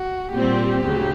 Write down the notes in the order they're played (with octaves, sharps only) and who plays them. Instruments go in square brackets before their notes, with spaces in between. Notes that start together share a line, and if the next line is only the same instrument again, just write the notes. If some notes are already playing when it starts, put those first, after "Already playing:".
Already playing: [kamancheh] F#4
[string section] A#2 G3 C4 [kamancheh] G4
[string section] D2 C#3 F#3